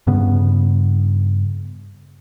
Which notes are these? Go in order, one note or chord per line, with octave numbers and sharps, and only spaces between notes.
G2 C#3 B3